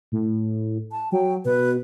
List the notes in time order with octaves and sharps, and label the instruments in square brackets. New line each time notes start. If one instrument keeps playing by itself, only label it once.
[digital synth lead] A2
[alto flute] A5
[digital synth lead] F#3 [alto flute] G5
[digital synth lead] B2 [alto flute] B4